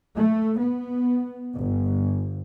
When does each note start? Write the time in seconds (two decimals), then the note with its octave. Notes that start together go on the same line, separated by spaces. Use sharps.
0.14 A3
0.58 B3
1.58 G1